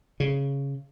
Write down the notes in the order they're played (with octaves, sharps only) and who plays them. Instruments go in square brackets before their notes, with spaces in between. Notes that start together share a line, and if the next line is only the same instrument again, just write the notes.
[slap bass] C#3